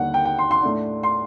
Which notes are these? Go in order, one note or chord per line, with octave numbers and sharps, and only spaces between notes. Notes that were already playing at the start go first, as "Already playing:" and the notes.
Already playing: D#2 D3 G3 A#3 D4 F#5
G5
G5
C6
C6
A2 A3 D4
C6